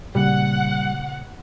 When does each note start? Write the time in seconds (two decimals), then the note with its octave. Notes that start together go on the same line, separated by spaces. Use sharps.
0.15 A#2 C#3 G3 A#3 F#5